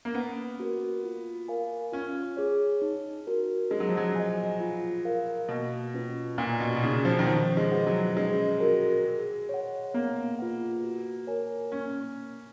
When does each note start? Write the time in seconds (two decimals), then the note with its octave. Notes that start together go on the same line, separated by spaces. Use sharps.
0.05 A#3
0.14 B3 C#4
0.60 F#4 A#4
1.04 F4
1.48 A#4 F5 G#5
1.92 C#4 F4
2.37 G#4 C#5
2.82 D#4
3.27 F#4 A#4
3.70 G#3 G#4
3.80 F#3
3.89 F3
3.97 F#3
4.15 D#5 G#5
4.60 F4
5.05 A#4 F5
5.49 B2 A#3
5.94 C#4 F4 B4
6.38 A#2 A#3
6.60 B2
6.76 B2
6.83 C#3 D#4 G#4
7.05 F3
7.19 D#3
7.27 F3 D#4
7.57 G#3
7.72 G#4 B4 F#5
7.87 F#3
8.16 G#3 C#4
8.60 F#4 A#4
9.05 G#4
9.49 C#5 F#5
9.94 A#3 B3
10.39 F4 B4 F#5
10.84 F#4
11.27 A#4 C#5 G#5
11.72 A#3 C#4